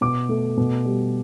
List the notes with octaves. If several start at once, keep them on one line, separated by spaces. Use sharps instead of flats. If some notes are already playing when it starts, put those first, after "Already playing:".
B2 D6
A3
B2
G3